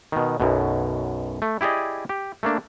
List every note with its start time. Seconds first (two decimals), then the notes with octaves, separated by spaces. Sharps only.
0.12 B2 D#3
0.40 B1 F#2 B2
1.42 A3
1.61 E4 G4 G#4 D5 D#5
2.09 G4
2.43 A3 A#3 D4